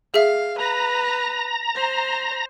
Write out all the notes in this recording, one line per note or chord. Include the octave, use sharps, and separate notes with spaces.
G#4 E5 F5
B4 A#5
C5